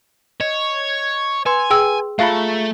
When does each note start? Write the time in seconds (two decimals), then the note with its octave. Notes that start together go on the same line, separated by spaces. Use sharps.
0.40 C#5 D#5
1.46 B4 G#5 C6
1.70 G#4 G5 E6
2.19 A3 F4 G#4 A4 E5 F5 B5